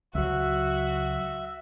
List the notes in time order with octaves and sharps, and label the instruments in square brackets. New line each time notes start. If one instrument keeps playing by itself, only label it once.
[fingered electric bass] C#2 F#3 [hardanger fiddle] F#4 [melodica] E5